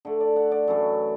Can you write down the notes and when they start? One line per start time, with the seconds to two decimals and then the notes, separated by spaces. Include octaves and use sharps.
0.05 D3 A3
0.21 D5
0.36 F#5
0.52 D5
0.68 F#2 E3 A3